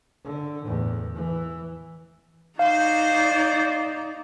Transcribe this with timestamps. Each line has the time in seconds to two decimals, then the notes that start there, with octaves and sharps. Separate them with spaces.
0.24 D3
0.65 E2 A2
1.15 E3
2.59 D#4 F#4 C5 D5 F5